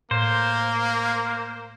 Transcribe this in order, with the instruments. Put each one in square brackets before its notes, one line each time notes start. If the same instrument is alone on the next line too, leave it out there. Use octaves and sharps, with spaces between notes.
[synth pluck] A2 [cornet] A#3 [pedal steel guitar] C5